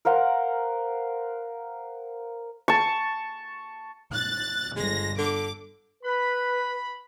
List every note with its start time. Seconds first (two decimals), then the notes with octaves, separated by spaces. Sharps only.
0.05 A#4 C5 F5 F#5
2.68 A5 C#6
4.12 F#6 A6
4.76 G1 G#3 A#6
5.18 D3 D6
6.04 B4 B5